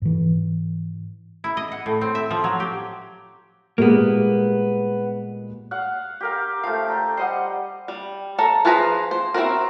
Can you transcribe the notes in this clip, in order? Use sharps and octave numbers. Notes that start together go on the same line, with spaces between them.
G#2 E3
E4
D#5
F#5
A2
C4
E5
F3
F#3
G4
A#2 G3 G#3 A#3 B3
F5 F#5
G4 A#4 F5
F3 A3 F5
G5 A#5
G3 C5 D#5 F#5
G3
A4 A#4
F3 F4 G#4 B4 A#5
C5
C4 E4 F#4 A#4